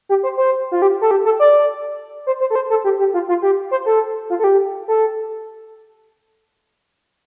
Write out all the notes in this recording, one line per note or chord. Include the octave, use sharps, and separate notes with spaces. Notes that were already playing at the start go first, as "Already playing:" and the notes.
G4
C5
C5
F4
G4
A4
G4
A4
D5
C5
C5
A4
C5
A4
G4
G4
F4
F4
G4
C5
A4
F4
A4
G4
A4